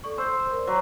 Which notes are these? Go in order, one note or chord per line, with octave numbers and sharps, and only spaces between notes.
A4 D5 C#6
C5 E6
A#4 D5
F#3 A#5 C6 E6